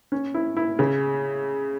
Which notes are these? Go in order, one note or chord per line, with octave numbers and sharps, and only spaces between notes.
C#4
E4
E4
C#3